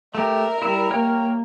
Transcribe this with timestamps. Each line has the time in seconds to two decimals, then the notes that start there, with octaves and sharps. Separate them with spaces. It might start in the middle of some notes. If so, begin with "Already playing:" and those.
0.15 A3 G4 A#4 E5
0.62 G3 E4 E5
0.91 A#3 C#5 G5 F6